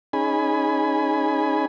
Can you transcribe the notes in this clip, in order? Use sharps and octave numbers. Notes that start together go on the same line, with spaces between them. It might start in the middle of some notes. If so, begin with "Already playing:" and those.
C#4 D#4 G#4 G#5 B5